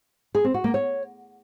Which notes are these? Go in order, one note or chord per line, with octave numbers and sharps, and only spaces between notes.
G#4
C4
F#4
A#3
C#5